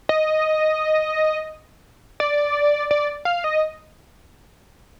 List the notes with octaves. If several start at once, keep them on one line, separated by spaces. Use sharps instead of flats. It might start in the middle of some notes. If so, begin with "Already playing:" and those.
D#5
D5
D5
F5
D#5